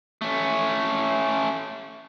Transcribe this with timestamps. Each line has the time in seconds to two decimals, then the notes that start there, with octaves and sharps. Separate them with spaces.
0.22 A3 C#4